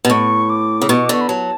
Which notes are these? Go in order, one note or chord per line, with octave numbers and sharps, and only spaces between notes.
B2
A2 C#6
D6
C#3
B2 C#6
D6
D3 C#6
B5
F#3 A5